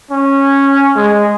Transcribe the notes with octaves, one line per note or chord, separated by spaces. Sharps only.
C#4
G#3